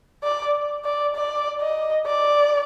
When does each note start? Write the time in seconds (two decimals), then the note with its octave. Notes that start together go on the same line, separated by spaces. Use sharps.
0.24 D5
0.85 D5
1.15 D5
1.61 D#5
2.06 D5